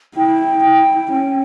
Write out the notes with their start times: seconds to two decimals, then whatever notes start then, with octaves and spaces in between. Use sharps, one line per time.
0.16 E4 G5
0.64 E4
1.12 C#4